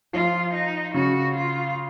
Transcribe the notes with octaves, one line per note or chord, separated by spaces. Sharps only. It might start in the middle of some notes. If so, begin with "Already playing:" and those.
F3 F4
D#4
C#3 F#4
F4